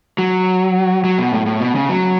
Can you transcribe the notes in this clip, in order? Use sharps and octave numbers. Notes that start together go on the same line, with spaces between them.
F#3
F#3
B2
A2
A2
B2
C#3
F#3